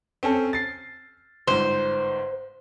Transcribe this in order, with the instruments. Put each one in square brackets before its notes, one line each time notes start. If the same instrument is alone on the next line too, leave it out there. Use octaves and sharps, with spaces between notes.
[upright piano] C4 C#4 A4
A6 C7
[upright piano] G1 G#2 [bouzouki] C5